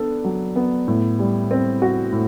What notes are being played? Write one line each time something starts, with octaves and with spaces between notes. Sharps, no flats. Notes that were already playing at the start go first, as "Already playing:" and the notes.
Already playing: B3 D4 A4
F#3
B3
A2
G3
C4
F#4
A2